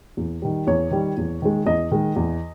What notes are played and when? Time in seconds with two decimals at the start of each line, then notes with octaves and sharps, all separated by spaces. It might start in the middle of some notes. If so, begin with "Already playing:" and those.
0.17 E2
0.42 D#3 G3
0.67 E2 C#5
0.91 D#3 G3
1.17 E2
1.42 D#3 G#3
1.66 E2 D#5
1.92 D#3 G#3
2.16 E2